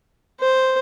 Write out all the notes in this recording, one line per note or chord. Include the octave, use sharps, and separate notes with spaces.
C5